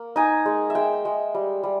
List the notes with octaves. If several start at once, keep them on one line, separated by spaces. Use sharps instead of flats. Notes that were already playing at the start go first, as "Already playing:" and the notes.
Already playing: A#3
D#4 G#5
G#3
E5
G#3 G5
G#3
G3
G3